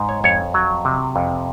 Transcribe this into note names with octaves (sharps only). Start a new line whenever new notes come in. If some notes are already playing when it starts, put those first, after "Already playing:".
Already playing: G#2
C#5
F2 C#5
F#3
C3
F2